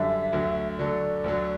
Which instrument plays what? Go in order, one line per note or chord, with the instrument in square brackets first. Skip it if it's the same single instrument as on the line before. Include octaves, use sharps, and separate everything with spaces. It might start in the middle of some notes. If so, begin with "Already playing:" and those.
Already playing: [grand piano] F#2 D3 G3 D4 [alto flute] E5
[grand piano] D2 D3 F#3
[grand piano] D3 F#3 A3 [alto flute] D5
[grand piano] D2 D3 F#3